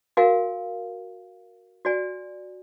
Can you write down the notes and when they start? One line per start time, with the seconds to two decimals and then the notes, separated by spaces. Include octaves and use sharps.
0.17 F#4 A#4 F5 G#5
1.85 F#4 D5 G#5